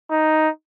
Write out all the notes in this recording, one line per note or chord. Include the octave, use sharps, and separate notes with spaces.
D#4